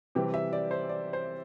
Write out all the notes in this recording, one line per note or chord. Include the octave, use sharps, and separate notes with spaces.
C3 E3 G3 G5
E5
D5
C5
D5
C5